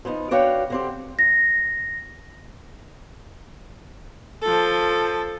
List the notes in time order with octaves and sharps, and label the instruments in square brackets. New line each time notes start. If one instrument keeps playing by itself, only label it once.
[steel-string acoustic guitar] F3 B3 D#4
B3 D4 F#4 C#5 F5 G5
D3 C4 G4
[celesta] A#6
[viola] F3 A4